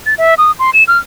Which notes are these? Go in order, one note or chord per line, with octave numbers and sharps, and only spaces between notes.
A6
E5
D#6
C6
E7
F6